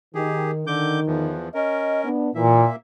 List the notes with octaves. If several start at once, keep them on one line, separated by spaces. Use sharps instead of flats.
D#3 G4 G#4
D3 D#3 D6 G6
E2 E3 F3
C#4 A#4 D#5
B3 D4
A#2 E3 A#3 E5